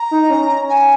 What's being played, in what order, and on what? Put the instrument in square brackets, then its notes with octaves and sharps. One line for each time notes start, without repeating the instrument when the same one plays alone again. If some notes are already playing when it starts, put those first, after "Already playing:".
Already playing: [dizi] A#5
[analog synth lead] D#4
C#4
[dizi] G#5